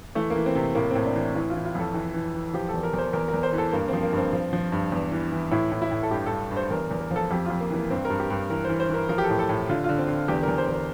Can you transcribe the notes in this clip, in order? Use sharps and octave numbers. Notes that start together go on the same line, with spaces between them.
E3 A3
A#3
E3
C4
C3
A2 A#3
A2 C4
D4
E3
E3 E4
E3 F4
F4
F2 A4
E3
E3
E3
F3 G4
E2 A4
A#4
E2 C5
E2 A#4
A#4
E2
C5
E3
A4
G2 A#3
F3 C4
A#3
G2 C4
F3
F3
G2
E2
E3
E3
A2 E4
A2
E4
A2
A4
G2 G4
G2 A4
G2
C5
E2 A#4
E2
A#4
F3
A4
F2 G4
F2 F4
A#3
E3 A#3
G2 C4
A#4
G2
G4
G2
E3 A#4
E3 C5
C5
E3 A#4
F3 A#4
G4
A4
A2
A4
A2
D3 F4
D3 F4
C4
D3
E2 G4
E2 A#4
C5
E2
A#4